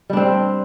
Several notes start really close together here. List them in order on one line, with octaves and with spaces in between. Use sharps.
G3 D4 C4